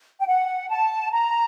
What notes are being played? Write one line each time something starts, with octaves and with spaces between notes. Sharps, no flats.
G5
F#5
A5
A#5